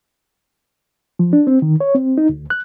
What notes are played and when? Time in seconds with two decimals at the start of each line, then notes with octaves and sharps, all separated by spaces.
1.19 F3
1.33 D4
1.47 C4
1.62 D#3
1.80 C#5
1.95 C4
2.18 D#4
2.29 D2
2.50 F#6